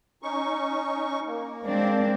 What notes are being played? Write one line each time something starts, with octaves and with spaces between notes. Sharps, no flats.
C#4 D#4 C#6
A#3
G#3 C4 D4